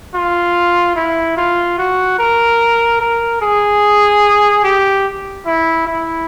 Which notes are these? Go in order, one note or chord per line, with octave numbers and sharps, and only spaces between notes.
F4
E4
F4
F#4
A#4
A#4
G#4
G4
E4
E4